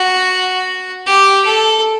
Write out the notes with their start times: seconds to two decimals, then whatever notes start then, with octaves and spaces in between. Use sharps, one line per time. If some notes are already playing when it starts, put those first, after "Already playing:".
Already playing: F#4
1.06 G4
1.45 A4